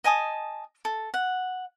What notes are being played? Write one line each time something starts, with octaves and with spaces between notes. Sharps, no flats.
D#5 G#5 A5 D#6
A4
F#5